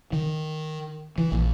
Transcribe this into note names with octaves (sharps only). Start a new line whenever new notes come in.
D#3
E3
A#1